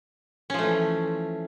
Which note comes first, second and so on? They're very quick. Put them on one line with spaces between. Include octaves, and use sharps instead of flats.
C#4 F3 A3 E3